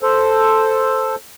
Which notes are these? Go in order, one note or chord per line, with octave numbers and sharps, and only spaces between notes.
A4 C5